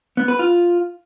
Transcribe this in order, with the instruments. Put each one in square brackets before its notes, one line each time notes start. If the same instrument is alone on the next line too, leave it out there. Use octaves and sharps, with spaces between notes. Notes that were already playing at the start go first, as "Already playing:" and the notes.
[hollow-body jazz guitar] B3
B4
F4